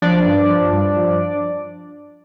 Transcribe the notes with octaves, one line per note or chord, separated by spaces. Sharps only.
F3 D4 D5
G2
F3
G2
F3